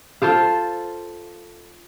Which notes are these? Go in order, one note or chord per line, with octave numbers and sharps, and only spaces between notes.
F4 A4 C5 F5